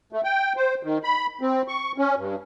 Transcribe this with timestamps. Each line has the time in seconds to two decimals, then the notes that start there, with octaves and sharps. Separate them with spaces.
0.13 A3
0.24 G5
0.57 C5
0.83 D#3
1.04 B5
1.41 C4
1.68 C#6
1.98 C#4
2.16 G2